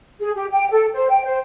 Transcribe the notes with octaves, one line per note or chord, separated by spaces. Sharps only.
G#4
G4
G5
A4
C5
G5
C5